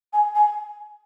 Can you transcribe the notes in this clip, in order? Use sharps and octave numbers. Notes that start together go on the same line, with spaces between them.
G#5
G#5